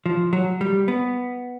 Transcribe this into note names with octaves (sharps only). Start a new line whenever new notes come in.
F3
F#3
G3
B3